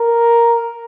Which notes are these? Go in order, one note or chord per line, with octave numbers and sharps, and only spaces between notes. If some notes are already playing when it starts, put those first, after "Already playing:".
Already playing: A#4